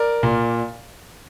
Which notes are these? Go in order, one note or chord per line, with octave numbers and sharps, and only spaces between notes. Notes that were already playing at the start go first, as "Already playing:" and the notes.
Already playing: A#4 D5
A#2